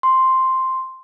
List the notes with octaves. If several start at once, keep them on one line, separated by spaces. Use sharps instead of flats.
C6